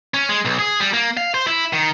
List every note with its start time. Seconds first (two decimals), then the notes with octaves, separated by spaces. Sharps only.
0.14 C#4
0.29 G#3
0.45 B1
0.59 G#4
0.80 G3
0.93 A#3
1.17 F5
1.34 C5
1.47 E4
1.73 D#3